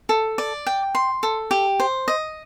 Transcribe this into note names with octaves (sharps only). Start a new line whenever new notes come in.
A4
D5
G5
C6
A4
G4
C5
D#5